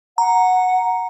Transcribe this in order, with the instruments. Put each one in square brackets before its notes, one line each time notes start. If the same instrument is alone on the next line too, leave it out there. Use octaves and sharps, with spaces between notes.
[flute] F#5 [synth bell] A#5